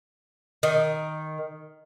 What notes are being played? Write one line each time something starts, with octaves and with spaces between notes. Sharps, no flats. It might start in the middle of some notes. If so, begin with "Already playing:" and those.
D#3